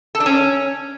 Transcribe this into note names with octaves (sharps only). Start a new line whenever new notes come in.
A4
D4
C#4